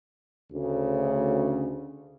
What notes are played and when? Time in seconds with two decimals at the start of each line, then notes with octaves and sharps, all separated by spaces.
0.52 D2 C#3